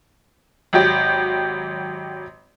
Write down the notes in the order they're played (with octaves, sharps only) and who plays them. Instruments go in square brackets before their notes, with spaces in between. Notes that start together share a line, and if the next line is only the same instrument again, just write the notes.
[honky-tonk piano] G#1 F#3 G4